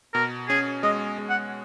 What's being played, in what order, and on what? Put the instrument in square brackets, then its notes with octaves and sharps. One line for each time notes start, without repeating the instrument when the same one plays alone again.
[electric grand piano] B2 [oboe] A#4
[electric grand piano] C#4 [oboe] G#4
[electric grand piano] G#3 [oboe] D#5
[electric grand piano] G#3
[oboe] F#5